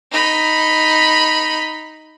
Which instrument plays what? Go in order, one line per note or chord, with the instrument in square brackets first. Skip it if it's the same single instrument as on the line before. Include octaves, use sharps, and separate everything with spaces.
[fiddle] D#4 B5